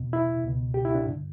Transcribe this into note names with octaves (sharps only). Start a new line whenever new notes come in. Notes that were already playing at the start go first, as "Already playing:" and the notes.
Already playing: E2 B2
E4
C#2 B2
G4
E4
D4
G2 D3